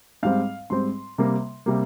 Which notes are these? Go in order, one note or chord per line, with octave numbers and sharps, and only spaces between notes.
G#2 G3 C4 F5
G#2 G3 C4 C6
C3 G3 A#3
C3 G3 A#3